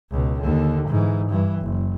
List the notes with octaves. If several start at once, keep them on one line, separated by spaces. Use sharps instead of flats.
C#2 B2
D#2 D3
G#2 E3
G2 E3
F#1